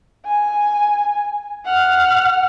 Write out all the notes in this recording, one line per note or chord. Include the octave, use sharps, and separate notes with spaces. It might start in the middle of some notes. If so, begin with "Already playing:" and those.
G#5
F#5 F6